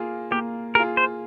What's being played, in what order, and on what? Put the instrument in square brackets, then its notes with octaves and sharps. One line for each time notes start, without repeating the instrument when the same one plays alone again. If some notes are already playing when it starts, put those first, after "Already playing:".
Already playing: [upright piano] A#3 F4 G#4
[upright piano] A#3 [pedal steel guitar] G4
[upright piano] F4 G#4 [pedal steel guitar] A#4
[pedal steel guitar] C5